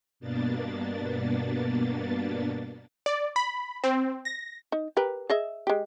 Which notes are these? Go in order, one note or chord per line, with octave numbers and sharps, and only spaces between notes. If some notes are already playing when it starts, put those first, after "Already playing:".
G2 B2 A#3 B3 D4 A6
D5
B5
C4
A#6
D#4
G4 A#4 B4
G#4 D#5 E5
G#3 G4